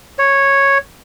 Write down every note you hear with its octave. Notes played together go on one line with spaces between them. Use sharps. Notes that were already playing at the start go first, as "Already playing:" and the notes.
C#5